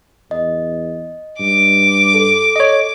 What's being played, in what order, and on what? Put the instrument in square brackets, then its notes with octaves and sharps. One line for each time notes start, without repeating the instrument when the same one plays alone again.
[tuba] E2 [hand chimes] D#5
[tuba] G2 [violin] D6
[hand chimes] A4
[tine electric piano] C#5 D#5